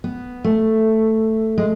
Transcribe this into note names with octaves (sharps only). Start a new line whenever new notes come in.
B3
A3
G#3